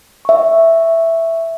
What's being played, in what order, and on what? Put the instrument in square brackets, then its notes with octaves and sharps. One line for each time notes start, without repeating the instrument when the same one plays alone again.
[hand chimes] E5 C#6